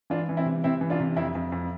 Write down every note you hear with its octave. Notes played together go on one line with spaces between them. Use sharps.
E3 D4 F4
E3
C4 E4
C3
C3 C4 E4
E3
D4 F4
C3
F2 C4 E4
F2
F2